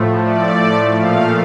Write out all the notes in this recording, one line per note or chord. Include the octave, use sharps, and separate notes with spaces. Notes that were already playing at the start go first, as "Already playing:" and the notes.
Already playing: A2 F3 A3
D5
A#2 F3 A3 F5